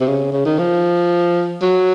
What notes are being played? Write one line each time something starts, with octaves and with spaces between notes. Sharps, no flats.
C3
C#3
C#3
D#3
F3
F#3